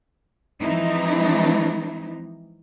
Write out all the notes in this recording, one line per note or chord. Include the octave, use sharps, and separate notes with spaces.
E3 F3 G#3 C4 D#4 E4